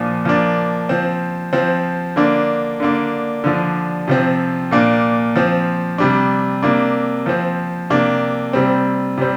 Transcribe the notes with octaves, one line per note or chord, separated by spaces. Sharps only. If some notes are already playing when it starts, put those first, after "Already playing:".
Already playing: A#2 F3 D4
F3 A#3 D4
F3 C4
F3 C4
D3 A#3 D4
D3 A#3 D4
D3 F3 D4
C3 F3 C4
A#2 A#3 D4
F3 C4
C3 G3 D4
C3 A#3 D4
F3 C4
C3 A#3 D4
C3 G3 C4
C3 G3 C4